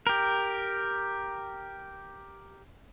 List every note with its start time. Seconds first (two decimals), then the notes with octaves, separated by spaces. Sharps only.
0.07 G4 A#4